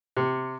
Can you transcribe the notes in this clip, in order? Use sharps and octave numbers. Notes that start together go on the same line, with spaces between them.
C3